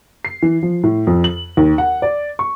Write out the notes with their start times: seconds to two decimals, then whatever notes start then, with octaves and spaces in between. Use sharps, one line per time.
0.25 C7
0.42 E3
0.63 F3
0.83 A2
1.07 F2
1.24 F#7
1.57 D#2
1.78 F#5
2.02 D5
2.39 C#6